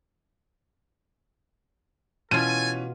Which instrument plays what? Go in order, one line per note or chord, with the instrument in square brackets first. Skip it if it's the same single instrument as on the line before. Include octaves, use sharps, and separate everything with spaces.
[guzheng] B2 F4 [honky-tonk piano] E3 C#4 [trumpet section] A4 G#5 [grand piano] D#7